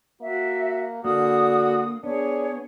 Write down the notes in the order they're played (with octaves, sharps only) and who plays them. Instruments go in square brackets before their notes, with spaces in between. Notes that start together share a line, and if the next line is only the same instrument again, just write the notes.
[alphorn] A#3 [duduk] F#4 [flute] E5
[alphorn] D3 [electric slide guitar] A#3 [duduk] F#4 [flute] D#6
[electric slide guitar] B3 [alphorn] D4 [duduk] G#4 [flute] C#5